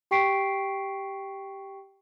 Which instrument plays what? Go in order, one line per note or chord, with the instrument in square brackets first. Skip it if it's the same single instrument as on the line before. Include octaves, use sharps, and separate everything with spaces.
[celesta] G4 G5 C#6 B6 C7 D7